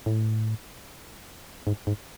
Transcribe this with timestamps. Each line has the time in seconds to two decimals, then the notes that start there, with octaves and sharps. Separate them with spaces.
0.06 A2
1.67 G#2
1.87 G#2